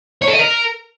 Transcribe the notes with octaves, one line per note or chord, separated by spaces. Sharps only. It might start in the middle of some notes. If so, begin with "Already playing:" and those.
C#5
A4
D#5
A#4